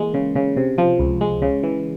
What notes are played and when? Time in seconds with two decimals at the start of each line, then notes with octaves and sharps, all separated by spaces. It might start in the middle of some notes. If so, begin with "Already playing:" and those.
Already playing: E3 G#3 A#3
0.14 C#3
0.35 C#3
0.57 C3
0.78 F3
0.99 C#2
1.21 G#3
1.42 C#3
1.63 E3